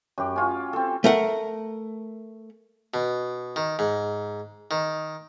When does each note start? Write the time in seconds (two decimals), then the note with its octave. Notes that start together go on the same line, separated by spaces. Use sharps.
0.18 F#2 G4
0.36 C#4 F4
0.73 C4 A4
1.04 A3 A#4 F#5
2.94 B2
3.56 D#3
3.79 G#2
4.71 D#3